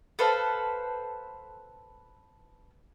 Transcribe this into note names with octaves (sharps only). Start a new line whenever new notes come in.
A4 B4 C5 F5